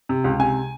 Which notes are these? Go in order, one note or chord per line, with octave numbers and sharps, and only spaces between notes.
C3
C#2
C3 G#5